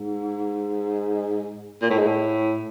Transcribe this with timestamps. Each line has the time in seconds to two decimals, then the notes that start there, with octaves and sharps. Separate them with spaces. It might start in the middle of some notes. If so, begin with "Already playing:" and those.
Already playing: G#2
1.82 A#2
1.90 A2
1.98 G#2
2.06 A2